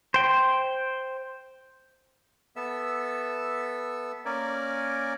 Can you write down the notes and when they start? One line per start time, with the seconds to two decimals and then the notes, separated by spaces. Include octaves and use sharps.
0.14 C5 G5
2.56 B3 A4 E5 E6
4.25 A#3 C#4 A#4 D5 G#5